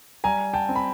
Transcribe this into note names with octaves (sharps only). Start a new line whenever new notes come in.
G3 G#5 A#5
G5 A5
C4
B5